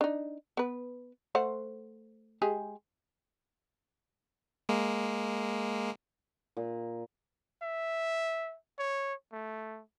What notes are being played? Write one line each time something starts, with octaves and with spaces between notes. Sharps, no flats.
D4 D#4
B3 B4
A3 C5 F#5
G#3 G4 G#4
G#3 A#3
A#2
E5
C#5
A3